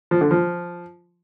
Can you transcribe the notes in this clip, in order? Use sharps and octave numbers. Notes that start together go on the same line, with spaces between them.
F3
D3
F3